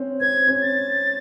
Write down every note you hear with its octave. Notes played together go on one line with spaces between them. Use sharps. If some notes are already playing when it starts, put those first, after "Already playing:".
Already playing: C4 C#4
C4 G#6
C#4
A6